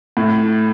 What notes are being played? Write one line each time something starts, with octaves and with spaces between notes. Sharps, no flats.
A2